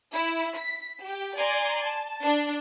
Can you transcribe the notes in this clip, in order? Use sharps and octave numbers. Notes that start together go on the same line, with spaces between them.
E4
B6
G4
D5 G#5 A#5 C6
A5
D4